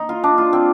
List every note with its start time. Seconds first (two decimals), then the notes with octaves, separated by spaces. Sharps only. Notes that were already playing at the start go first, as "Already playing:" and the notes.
Already playing: D#4
0.09 F4
0.24 D4
0.38 F4
0.53 C4